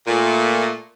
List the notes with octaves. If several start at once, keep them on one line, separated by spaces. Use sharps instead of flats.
A#2 A3